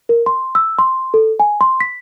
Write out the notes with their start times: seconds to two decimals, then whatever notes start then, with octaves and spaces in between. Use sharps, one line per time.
0.09 A#4
0.26 C6
0.55 E6
0.79 C6
1.14 A4
1.40 G#5
1.61 C6
1.80 B6